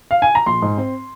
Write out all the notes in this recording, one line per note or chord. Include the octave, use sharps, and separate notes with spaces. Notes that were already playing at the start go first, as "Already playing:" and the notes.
F5
G#5
A#5
A#1 C6
G#2
C4